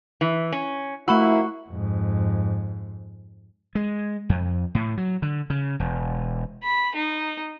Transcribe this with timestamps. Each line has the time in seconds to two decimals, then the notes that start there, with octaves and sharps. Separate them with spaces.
0.21 E3
0.52 C#4
1.08 F2 A3 A#3 E4 F#4 B5 E6
1.70 F2 G#2
3.75 G#3
4.29 F2
4.75 A2
4.97 F#3
5.22 D3
5.50 C#3
5.80 E1
6.63 B5
6.95 D#4